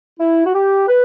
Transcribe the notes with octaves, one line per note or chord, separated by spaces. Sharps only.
E4
F#4
G4
B4